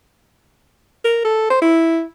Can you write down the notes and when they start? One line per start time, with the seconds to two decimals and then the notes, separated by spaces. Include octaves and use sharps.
1.05 A#4
1.25 A4
1.50 C5
1.62 E4